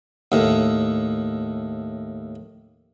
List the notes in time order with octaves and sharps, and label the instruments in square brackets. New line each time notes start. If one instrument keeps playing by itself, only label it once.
[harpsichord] D#2 A2